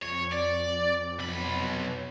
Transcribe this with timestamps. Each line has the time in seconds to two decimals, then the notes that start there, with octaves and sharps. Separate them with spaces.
0.02 F2 C#5
0.32 D5
1.19 B1 B5